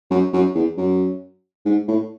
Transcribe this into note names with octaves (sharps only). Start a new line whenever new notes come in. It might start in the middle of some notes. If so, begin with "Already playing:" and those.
F#2
F#2
E2
F#2
G#2
A2